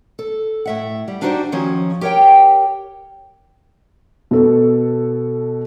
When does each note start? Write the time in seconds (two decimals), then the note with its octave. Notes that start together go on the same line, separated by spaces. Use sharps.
0.19 A4
0.65 A2 E5 F#5
1.08 G3
1.22 D4 D#4 F#4 G4 C5 D5
1.52 D#3 F3 F#3 C#4
2.01 G4 A#4 C#5 E5 G5
4.31 B2 A4